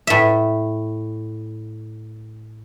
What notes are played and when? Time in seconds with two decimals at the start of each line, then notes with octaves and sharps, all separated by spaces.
0.07 A2 E5